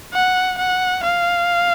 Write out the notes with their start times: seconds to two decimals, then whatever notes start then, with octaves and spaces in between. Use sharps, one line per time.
0.14 F#5
0.59 F#5
1.04 F5